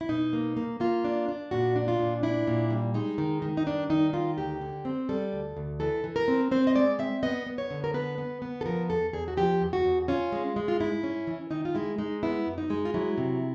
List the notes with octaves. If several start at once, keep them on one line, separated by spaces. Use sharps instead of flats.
E4
B2 D#4
A#3
A#3
A#3 F4
D4
D4
A#2 F#4
D4
F4
A#2
D4 E4
A#2
G3
G#3 D#4
D#3
D#3
D#4
G2 D4
D#3 D#4
D#3 F4
D2 G4
D3
C4
G3 A4
D2
D2
E3 A4
E3
A#4
C4
C4 C5
D#5
G#3 D5
C4 E5
B3 D#5
B3
C#5
D3
A#4
B3 B4
B3
B3
A4
F3 A#4
E2 A4
E2 G#4
F#4
F3 G4
E2
F#4
E2
C#4 F4
G#3
G#3
F4
G#2 E4
C#4
E3
D#3 D#4
F4
G#3 E4
G#3 D#4
B3 E4
F#2
D#4
G#3
F4
F#3 E4
C3